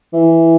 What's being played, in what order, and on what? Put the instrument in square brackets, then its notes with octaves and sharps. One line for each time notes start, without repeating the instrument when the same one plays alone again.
[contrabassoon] E3